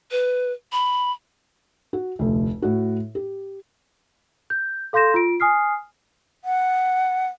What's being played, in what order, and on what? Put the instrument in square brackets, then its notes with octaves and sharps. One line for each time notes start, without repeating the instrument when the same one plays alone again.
[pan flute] B4
B5
[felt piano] F#4
F1 D2
A2 F#4
G4
[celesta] G6
A4 F5 C6 G6 A#6 E7
F4 D7
G#5 D#6 F6 C7
[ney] F#5